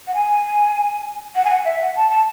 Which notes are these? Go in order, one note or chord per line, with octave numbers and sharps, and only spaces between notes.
F#5
G#5
F#5
G#5
F#5
E5
F#5
A5
A5